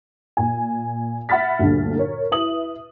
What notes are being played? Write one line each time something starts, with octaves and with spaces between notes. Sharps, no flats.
A#2 G#5
E5 F#5 B5 F6 A6 B6
D2 G2 A#2 D3
A#4 C#5
E4 B4 E5 D#6 F#7